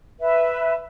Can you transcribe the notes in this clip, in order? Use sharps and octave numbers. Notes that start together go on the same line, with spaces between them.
B4 E5